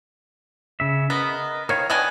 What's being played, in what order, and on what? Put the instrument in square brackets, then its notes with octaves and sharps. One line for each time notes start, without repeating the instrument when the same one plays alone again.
[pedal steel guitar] C#3 E5
[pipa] B3 [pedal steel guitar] A#4 D#5
[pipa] D#3 [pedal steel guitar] A#4 C#5 F5
[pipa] B3 D4 G#5 [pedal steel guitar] D#5 G5 D#6